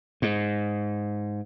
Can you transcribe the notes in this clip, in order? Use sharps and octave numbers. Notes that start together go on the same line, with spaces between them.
G#2